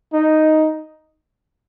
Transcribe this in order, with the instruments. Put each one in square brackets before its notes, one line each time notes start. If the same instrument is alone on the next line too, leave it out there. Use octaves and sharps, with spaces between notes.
[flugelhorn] D#4